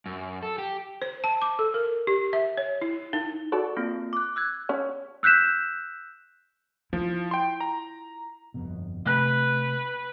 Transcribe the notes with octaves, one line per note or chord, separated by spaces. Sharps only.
F#2
A4
G4
C5
A5
D6
A4
A#4
G4
E5
C#5
E4
D#4
F#4 A4 D5
A#3 C4 F4
D6 F#6
E6 F#6 G#6
C#4
E6 F#6 G6 B6 E7
F3 E4 F4
G5 C6
A#5
G1 F2 B2
C3 A3 B4 F#6